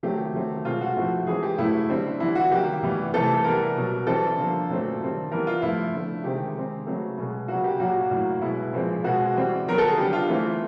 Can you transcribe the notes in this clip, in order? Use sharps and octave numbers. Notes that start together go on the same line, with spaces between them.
D#3 F#3 A3 C4 G4
D#3 F#3 A3 C4
B2 G#3 C4 F4
F#4
A2 F3 A3 C4
E3 G#3 C4 G#4
G4
A2 F#3 A3 E4
D3 G3 C4
E3 G3 B3 E4
F#4
D#3 F#3 A#3 G4
A2 E3 G3 B3
C3 E3 A3 C4 A4
A4
E3 G3 B3 A#4
B2 F#3 B3
E3 G3 C4 A4
D3 F3 A#3
A#2 F#3 A3 C4
D#3 G3 C4
E3 G3 B3 A#4
F4
A2 F3 A3 E4
D3 F3 A3
C3 D#3 G#3 C4 G4
D#3 G#3 C4
C#3 F#3 A3 C4
B2 G#3 B3
C#3 F#3 A#3 F#4
G4
A#2 F#3 A#3 F#4
A2 F#3 A#3
B2 G#3 B3 E4
A#2 F3 G#3 C4
B2 G#3 C4 F#4
E3 G3 C4
D#3 F#3 B3 A#4
A4
G#4
D3 G3 B3 G4
F4
E3 A3 C4